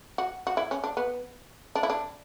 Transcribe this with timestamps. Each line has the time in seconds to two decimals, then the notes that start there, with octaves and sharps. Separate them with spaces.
0.18 F#4
0.47 F#4
0.57 E4
0.71 C#4
0.84 D4
0.97 B3
1.75 D4
1.83 E4
1.90 D4